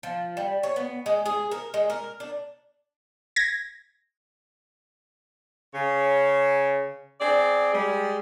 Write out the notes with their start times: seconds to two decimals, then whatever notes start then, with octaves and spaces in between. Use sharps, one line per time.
0.03 F3
0.37 G3
0.63 C#5
0.76 B3
1.06 G#3
1.26 G#4
1.51 A#4
1.74 G#3
1.90 A#4
2.20 D4
3.36 G#6 A#6
5.74 C#3 C#5
7.21 C4 G#4 D5
7.73 G3 G#3